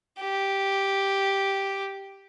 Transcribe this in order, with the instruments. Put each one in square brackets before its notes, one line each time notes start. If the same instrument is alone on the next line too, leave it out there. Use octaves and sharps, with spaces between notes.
[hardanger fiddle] G4